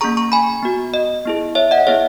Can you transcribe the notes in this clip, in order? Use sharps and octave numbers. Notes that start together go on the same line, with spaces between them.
A#3 C#4 G#4 A#5 C#6
A#5 C#6
G#5 B5
B3 F#4
D#5
B3 E4 G#4
C#5 E5
D#5 F#5
B3 E4 G#4 C#5 E5